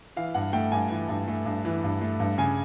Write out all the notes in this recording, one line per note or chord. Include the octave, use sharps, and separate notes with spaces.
E3 F5
G2 F#5
A3 G5
G2 G#5
E3
G2
A3
G2
E3
G2
A3
G2
C#3 G#5